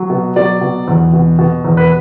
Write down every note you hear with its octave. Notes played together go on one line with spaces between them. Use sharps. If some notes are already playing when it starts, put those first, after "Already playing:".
Already playing: F#3
B2
F#3 D5
B2
E2
B2
B2
E2
B4